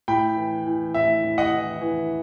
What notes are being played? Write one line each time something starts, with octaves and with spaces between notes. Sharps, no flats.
A2 G5 B5
E3
E3
A2 E5
A2
D#5 F#5
E3
E3